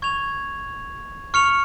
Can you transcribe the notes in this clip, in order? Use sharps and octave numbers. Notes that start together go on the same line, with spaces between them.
C#6 G#6 F7
C#6 F6 C#7 F7